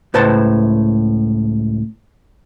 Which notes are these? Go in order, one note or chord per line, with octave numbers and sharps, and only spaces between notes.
C#2 A2 B4 C5 A5